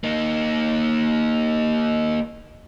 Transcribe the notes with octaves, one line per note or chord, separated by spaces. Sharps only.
A#3 D#4